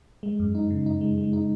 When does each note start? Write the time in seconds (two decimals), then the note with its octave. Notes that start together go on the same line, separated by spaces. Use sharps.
0.23 G#3
0.40 F#2
0.55 D#4
0.70 C#3
0.86 D#4
1.01 G#3
1.18 G#3
1.33 D#4